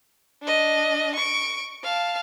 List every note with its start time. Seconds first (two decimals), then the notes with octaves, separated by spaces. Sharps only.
0.42 D4 D#5
1.16 C#6 D7
1.83 F5 A5